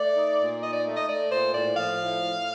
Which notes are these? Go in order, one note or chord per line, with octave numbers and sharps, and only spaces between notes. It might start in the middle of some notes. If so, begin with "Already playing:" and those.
Already playing: A3 D5
D#4
A#2
D#4 D#5
D5
A3
D#5
A3 D5
A#2 C5
A2 D5
F3 F5
A2
A2